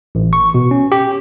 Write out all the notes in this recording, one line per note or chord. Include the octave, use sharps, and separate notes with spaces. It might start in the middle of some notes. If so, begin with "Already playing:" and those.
A1
C#6
B2
C#4
G4